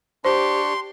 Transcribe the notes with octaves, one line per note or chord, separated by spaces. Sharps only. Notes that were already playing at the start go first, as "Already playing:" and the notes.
D4 G4 C5 C6 C#6